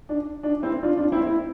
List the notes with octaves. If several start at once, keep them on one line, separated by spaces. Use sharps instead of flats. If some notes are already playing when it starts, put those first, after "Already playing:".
D4
D4
C4 E4
D4 F4
D4 F4
C4 E4
C4 E4